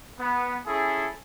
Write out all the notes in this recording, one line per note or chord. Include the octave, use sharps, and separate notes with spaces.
B3
C#4 E4 G#4 A4